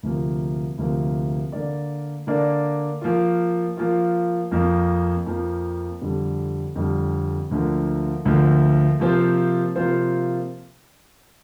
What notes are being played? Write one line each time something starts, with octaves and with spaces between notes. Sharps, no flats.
D2 C3 F3 A#3
D2 C3 F3 A#3
D3 A#3 D4 A#4 D5
D3 A#3 D4 A#4 D5
F3 A#3 F4
F3 A#3 F4
F2 F3 A#3
F2 F3 A#3
F2 D3 G3
F2 D3 G3
D2 D3 F3 A#3
D2 D3 F3 A#3
C3 F3 A#3 F4 C5
C3 F3 A#3 F4 C5